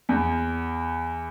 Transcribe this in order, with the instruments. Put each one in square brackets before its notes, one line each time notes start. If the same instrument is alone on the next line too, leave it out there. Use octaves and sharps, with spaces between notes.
[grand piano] E2